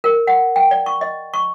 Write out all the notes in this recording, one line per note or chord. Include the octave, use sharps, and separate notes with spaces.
A#4
F#5
G5
D5
C#6
D#5
C#6